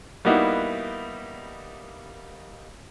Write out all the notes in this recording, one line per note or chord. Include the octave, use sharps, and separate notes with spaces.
G3 A#3 B3 D#4 E4 F#4